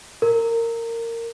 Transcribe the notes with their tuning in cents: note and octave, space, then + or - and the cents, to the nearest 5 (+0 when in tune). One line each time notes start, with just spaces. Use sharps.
A#4 -20